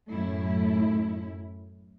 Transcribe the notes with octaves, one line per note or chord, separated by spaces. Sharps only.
F#2 A2 A3 E4